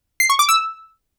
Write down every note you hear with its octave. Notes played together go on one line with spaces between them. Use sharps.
C7
C#6
D6
E6